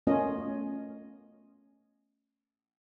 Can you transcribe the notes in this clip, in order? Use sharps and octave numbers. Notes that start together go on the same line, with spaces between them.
A3 B3 C#4 F4 A#4 D#5